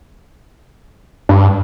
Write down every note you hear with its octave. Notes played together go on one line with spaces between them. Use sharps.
G2